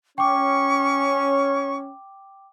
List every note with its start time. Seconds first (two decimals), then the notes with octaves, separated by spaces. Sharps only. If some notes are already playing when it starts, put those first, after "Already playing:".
0.18 C#4 G5 C#6 D6